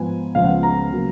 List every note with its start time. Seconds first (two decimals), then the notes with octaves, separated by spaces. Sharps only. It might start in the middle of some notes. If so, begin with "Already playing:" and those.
Already playing: G#2 F3 B3 G#5
0.35 C#2 C#3 F3 G#3 B3 F5
0.44 F#5
0.63 A#5
0.92 C#3 F#3 A#3